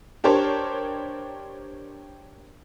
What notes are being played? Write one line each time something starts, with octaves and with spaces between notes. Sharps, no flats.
D4 G4 A#4 C5 C#5 A5